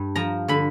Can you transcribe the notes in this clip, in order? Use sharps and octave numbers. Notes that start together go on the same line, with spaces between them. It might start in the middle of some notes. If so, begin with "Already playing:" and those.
Already playing: G2
F3 A#5
D3 B5